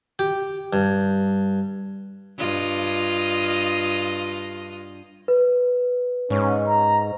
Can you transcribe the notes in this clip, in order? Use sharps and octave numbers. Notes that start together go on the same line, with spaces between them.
G4
G2
G2 F4 D#5
B4
G#2 C#4
A#5